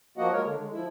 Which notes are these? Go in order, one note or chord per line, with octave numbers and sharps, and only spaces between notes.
F3 A#3 F#4 D#5 F#5
G#3 A#4 C#5
D3
G#3
F3 E4